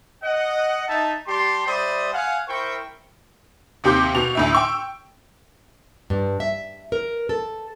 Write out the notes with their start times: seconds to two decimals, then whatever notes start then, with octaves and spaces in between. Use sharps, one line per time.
0.24 D#5 F#5
0.88 D#4 E5 A5
1.28 G3 G4 A5 C6
1.67 G3 C5 D5 E5 B5 D#6
2.13 F5 F#5 G#5
2.48 E4 A#4 C5 G5 C#6
3.84 D#2 C3 G4 C6 D6 G6
4.14 B2 F7
4.35 D2 A2 E5
4.53 G5 C#6 E6
6.10 G2
6.40 E5
6.92 A#4
7.29 A4